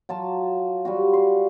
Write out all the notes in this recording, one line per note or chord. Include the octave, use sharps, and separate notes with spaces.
F#3 F4 A5
G3 F4 F#4
C6